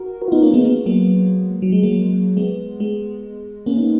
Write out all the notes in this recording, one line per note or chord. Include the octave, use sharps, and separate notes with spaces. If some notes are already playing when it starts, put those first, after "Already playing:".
Already playing: F#4 A#4
F#4 A#4
F4
B3 D#4
A#3 C#4
G#3 B3
G#3 B3
F#3 A#3
F#3
G#3
F#3 A#3
G#3 B3
G#3
A#3 C#4
B3 D#4